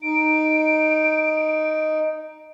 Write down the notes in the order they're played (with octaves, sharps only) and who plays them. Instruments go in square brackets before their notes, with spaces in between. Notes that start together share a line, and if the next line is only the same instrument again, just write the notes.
[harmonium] D#4 [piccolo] D7